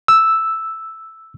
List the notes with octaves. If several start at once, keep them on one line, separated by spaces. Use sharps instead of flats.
E6